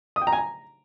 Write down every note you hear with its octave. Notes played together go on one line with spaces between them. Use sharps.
D#6
G5
A#5
G#5
A#5